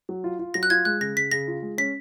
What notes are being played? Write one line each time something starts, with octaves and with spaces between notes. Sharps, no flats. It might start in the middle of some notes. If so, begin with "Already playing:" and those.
F#3
F4
F4
F#3 A#6
F#6
F4 G#6
G#3 F#6
C#3 A#6
C#3 B6
C#3 A#6
F4
G#3
C#4 B6